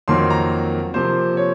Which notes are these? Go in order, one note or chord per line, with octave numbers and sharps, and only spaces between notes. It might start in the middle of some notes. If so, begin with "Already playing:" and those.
F2 D#3 F#3 A#3 C6
A#5
C3 F3 A#3 C5
C#5